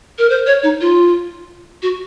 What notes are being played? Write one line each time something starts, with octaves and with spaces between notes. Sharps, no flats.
A#4
C5
C#5
D#4
F4
F#4